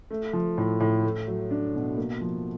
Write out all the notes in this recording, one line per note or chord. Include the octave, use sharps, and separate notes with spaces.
A3
F3
A2
A2
A3
F#3
D4
B2
A#3
F3